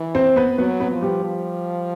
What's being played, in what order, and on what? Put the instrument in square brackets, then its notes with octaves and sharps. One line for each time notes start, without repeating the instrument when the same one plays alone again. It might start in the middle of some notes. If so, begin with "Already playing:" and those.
Already playing: [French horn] E3
[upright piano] C4 C5
B3 B4
[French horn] F#3 [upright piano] B3 B4
[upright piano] B3 B4
[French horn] F3
[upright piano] G3 G4
[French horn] F3